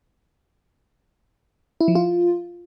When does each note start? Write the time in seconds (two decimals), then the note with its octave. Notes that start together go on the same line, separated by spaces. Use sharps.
1.81 E4
1.88 F3
1.95 F4